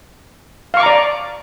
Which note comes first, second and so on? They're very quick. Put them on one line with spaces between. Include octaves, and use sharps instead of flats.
F5 C#6 D6 A#5 D5